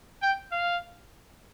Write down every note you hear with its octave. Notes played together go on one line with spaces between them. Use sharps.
G5
F5